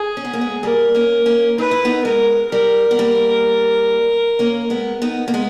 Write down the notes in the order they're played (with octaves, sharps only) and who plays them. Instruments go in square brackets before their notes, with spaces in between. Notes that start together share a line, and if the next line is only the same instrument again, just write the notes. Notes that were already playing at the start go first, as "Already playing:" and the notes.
Already playing: [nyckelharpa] G#4
[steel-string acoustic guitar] C#4
B3
A#3
G#3 B3
[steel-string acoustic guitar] G3 A#3 [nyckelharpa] A#4
[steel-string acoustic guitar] A#3 C#4
A#3 C#4
[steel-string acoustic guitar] D#4 [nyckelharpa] B4
[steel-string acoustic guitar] E4
B3 D#4
[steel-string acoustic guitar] G#3 [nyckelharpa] A#4
[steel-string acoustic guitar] G3 [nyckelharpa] A#4
[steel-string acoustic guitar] B3
G3 A#3
A#3 C#4
G#3 B3
B3 D#4
A#3
G#3 B3